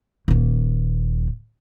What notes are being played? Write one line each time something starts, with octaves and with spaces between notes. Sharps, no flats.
D#1 A#2